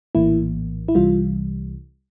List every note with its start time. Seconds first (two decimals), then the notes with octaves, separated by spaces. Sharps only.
0.15 A#1 A2 E3 A#3 E4
0.88 E4
0.95 C2 C3 E3 G3 F4